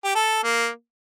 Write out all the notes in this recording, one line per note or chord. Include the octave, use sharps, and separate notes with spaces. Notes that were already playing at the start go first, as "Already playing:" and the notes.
G4
A4
A#3